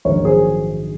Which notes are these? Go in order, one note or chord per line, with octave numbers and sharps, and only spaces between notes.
A#1 G#2 D#3 F#3 A#4 C#5
G#4 C5